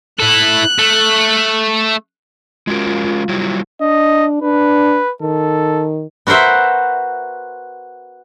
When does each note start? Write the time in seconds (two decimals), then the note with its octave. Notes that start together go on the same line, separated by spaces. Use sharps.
0.20 E4 A4 F#6
0.79 A3
2.67 G#3 C#4 F4 F#4 A#4
2.87 F4
3.05 F4
3.29 F#3 G3 E4
3.81 D4 D#5
4.42 D4 B4
5.22 D#3 A4
6.27 B3 F#4 A#4 C5 E5